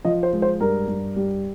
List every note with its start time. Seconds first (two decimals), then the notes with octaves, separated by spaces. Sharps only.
0.05 F3 D#5
0.23 C5
0.33 G#3
0.42 C5
0.60 G2 A#4
0.88 G2
1.16 G3